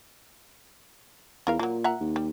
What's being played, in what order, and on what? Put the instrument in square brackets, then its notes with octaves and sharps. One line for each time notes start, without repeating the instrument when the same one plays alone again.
[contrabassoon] E2 [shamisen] F4 A#4 F5
[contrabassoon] A#2 [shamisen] F#3 A#3
[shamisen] E5 F#5 A#5
[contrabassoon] D#2
[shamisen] G3